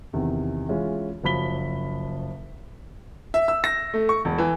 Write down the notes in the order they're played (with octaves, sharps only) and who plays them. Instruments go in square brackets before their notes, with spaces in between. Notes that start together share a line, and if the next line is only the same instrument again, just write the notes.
[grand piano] E2 C3 D#3
E3 G#3 C#4 E4 F4
F#1 F3 F#3 B5 B6 G7
[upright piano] E5
E6
A#6
A3
C#6
E1
E3